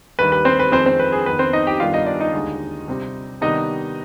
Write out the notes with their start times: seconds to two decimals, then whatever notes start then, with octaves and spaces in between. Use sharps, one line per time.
0.19 D#2 D#3 G3 B4
0.32 B4
0.45 C4 C5
0.60 B4
0.72 F2 D#3 G#3 C4 C5
0.86 C4 C5
0.99 B4
1.12 G#4
1.26 F2 D#3 B3 B4
1.39 C4 C5
1.53 D#4 D#5
1.67 G4 G5
1.80 G2 D#3 G3 B3 D4 F4 F5
1.94 D#4 D#5
2.06 D4 D5
2.20 D#4 D#5
2.34 D#2 D3 G#3
2.88 C3 G3 C4
3.41 C3 D#3 G3 B3 D4 D#4 D#5